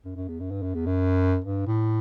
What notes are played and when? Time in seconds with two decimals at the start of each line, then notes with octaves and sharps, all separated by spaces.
0.05 F#2
0.16 F#2
0.28 E2
0.40 F#2
0.51 G2
0.63 F#2
0.75 E2
0.86 F#2
1.44 G2
1.67 A2